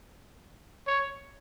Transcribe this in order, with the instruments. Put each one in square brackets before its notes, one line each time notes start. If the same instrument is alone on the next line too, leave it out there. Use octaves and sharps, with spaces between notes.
[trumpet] C#5